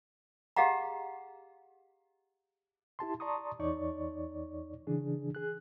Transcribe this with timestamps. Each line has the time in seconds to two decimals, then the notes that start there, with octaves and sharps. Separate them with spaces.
0.56 G4 G#4 D#5 F5 F#5 A#5
2.99 E4 G4 A5 C6
3.20 D5 A5 A#5 C6 C#6 D#6
3.59 E2 D#4 C#5 D5 C#6
4.87 C#3 E3 D4 G#4
5.35 G#4 F#6